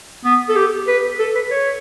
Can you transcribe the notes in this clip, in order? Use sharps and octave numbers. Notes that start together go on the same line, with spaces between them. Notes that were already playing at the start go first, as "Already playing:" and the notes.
B3
A4
G4
B4
A4
B4
C#5